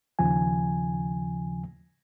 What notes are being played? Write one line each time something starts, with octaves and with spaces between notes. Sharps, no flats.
D#2 C#3 F3 G#5